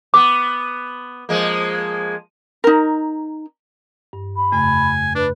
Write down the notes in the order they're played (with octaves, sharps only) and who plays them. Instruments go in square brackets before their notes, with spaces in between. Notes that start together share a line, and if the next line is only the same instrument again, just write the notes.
[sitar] B3 [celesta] D6
[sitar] F3 G#3 A#3
[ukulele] D#4 A#4
[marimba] G2
[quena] B5
[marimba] F2 C#3 A3 [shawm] G#5
[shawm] D4 [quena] B4